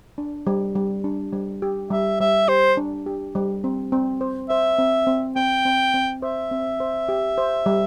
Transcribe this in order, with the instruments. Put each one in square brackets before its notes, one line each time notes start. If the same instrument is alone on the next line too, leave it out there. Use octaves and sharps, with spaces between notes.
[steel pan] D4
G3
G3
D4
G3
G4
[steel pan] G3 [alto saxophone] E5
[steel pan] G3 [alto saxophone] E5
[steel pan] G4 [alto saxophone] C5
[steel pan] D4
G4
G3
C4
C4
C5
[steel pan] C5 [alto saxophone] E5
[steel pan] C4
C4
[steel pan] C4 [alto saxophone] G5
[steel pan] C4
C4
[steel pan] C5 [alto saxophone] E5
[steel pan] C4
C5
G4
C5
G3